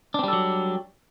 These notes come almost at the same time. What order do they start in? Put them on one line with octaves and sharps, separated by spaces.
D4 C4 G3 A4 F#3